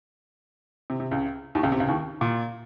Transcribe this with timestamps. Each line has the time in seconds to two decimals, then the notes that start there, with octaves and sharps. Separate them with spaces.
0.90 C3
1.00 C3
1.11 C#2 C#3
1.55 D#2 D#3
1.63 C#2 C#3
1.72 C3
1.80 C#2 C#3
1.88 D#2 D#3
2.21 A#2